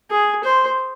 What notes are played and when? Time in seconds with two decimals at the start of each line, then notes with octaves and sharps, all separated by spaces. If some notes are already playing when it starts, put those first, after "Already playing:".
0.11 G#4
0.44 C5